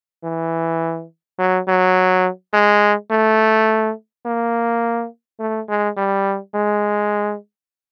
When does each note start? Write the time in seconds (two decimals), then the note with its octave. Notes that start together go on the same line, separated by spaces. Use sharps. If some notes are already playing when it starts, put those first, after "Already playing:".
0.24 E3
1.39 F#3
1.68 F#3
2.53 G#3
3.11 A3
4.26 A#3
5.40 A3
5.69 G#3
5.98 G3
6.55 G#3